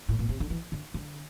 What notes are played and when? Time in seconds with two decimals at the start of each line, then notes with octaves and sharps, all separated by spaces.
0.08 A2
0.19 A#2
0.29 C3
0.40 D3
0.50 E3
0.72 D3
0.94 D3